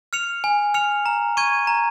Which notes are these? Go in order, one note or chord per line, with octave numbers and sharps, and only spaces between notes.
F6 C#7 F7
G#5
F6 C#7 F7
A#5
C#6 G#6 D#7
A#5